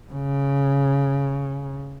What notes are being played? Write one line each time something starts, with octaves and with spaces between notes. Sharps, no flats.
C#3